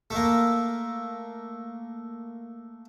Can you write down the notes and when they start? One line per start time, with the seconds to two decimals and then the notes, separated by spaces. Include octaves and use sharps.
0.10 A3 A#3